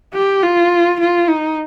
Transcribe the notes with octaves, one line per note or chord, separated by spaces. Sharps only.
G4
F4
F4
D#4